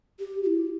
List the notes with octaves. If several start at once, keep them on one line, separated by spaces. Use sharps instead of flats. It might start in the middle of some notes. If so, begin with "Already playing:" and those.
G4
F#4
E4